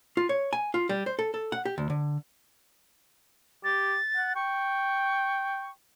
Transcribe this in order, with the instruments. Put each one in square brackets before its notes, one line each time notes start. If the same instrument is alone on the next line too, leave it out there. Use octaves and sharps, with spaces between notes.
[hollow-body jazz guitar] F4
C#5
G#5
F4
G3
C5
A4
A4
F#5
G4
D2
D3
[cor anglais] G4 [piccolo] A6
[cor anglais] F#5
[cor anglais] G5 [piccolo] C#6